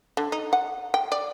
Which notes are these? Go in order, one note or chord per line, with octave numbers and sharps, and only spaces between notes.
D3
D#4
F#5
G5
D5